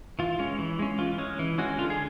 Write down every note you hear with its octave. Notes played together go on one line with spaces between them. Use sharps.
E3 F4
G#3 C#4
E3
G#3 C#4
E3 F4
G#3 C#4
E3
G#3 C#4 F#4
D3 F4
G#4